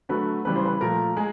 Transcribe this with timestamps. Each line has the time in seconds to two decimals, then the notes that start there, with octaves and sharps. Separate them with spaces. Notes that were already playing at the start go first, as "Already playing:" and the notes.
0.09 D3 F#3 A3 B4
0.45 C#3 E3 G3 B4
0.56 C5
0.65 B4
0.81 A#2 F3 A3 A#4
1.17 G#3 G#4